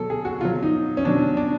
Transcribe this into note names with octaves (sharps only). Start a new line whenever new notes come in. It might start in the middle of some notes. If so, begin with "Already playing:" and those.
Already playing: B2 F#3 A4
G#4
F#4
B2 F#3 F4
D#4
C#4
B2 F#3 D4
D4